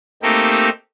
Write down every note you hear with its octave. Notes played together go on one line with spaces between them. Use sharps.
A3 A#3 C4 D#4 G4 A4